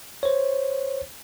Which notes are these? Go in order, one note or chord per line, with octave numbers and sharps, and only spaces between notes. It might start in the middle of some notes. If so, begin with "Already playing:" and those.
C5 C#5